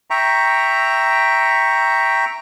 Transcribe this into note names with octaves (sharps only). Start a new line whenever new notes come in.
E5 G5 A#5 C#6